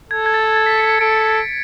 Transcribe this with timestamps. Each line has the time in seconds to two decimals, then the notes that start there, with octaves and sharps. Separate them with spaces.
0.11 A4 G#6
0.26 G#6
0.34 A6
0.56 A6
0.66 B6
0.78 C#7
0.90 C#7
1.01 A4 D7